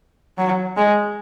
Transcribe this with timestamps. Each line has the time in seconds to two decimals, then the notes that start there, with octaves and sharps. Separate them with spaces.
0.38 F#3
0.77 G#3